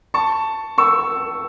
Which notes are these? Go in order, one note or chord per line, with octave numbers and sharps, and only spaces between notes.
A5 C#6
C#6 E6